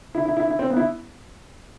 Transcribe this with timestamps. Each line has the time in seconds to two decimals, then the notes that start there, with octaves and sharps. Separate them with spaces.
0.15 E4
0.25 E4
0.37 E4
0.48 E4
0.59 C4
0.70 B3
0.77 E4